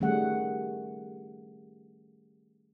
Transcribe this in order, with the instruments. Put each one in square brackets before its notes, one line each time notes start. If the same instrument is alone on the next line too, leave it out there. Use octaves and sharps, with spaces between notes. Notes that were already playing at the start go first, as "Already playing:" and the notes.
[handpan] D#3 G3 A3 C#4 G#4 F#5